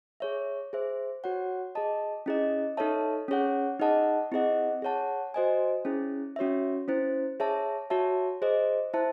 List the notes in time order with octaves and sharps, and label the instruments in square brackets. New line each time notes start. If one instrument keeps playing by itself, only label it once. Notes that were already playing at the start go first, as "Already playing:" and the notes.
[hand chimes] G#4 C#5 E5
G#4 C5 E5
F#4 C#5 F#5
G#4 D#5 A5
C#4 E4 G#4 D#5
D#4 A4 C#5 E5 A5
C#4 G#4 C#5 F#5
D#4 G#4 D#5 F#5 A5
C4 E4 G#4 D#5 F#5
G#4 C#5 F#5 A5
F#4 C5 D#5 G#5
C#4 E4 G#4
C#4 F#4 C#5 E5
C#4 E4 C5
G#4 C#5 E5 A5
F#4 C#5 E5 A5
G#4 C5 D#5
E4 C5 E5 A5